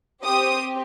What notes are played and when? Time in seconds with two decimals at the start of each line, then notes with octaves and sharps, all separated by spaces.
0.24 C4 G4 D#6